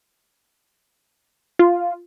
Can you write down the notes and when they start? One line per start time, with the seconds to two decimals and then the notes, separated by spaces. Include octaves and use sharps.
1.59 F4